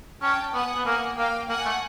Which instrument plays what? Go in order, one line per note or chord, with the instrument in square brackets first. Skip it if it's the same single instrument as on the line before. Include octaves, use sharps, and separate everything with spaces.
[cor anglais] C#4 [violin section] G5 A5
[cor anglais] B3 [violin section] F#5 G#5
[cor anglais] B3
[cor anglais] A#3 [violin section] F#5 G#5
[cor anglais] A#3 [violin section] F5 G5
[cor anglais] A#3 [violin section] F#5 G#5
[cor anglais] A3